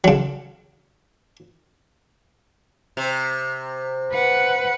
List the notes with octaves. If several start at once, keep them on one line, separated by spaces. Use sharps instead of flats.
C#3 F#3
C3
B4 F#5